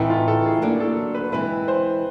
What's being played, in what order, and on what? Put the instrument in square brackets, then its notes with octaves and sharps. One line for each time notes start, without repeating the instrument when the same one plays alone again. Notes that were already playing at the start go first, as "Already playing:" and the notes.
Already playing: [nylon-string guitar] A2 E3 A3 C4 D#4 [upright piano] E4
[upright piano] F4
A4
G#4
[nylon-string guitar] F#3 A#3 D4 F#4
[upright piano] A4
B4
[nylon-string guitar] E3 G#3 C4 E4 [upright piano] B4
[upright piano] C5